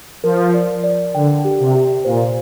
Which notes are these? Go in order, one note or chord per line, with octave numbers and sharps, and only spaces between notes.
F3 A#4
D5
D5
D3 G5
G4
C3
G4
A#2 C5